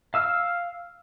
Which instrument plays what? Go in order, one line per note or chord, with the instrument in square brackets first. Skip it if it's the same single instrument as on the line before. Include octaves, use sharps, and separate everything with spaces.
[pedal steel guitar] F5 E6 F6